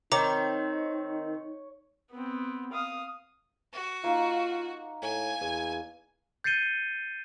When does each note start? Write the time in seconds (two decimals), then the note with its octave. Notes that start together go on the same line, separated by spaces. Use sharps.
0.12 D#3 C4 D#4 C#5 A#5 D6
2.11 B3 C4
2.72 F5 D#6
3.73 F#4
4.04 A#3 D#4 F4
5.02 A2 G#5
5.41 E2
6.44 G6 A6 C7 C#7 D#7 G7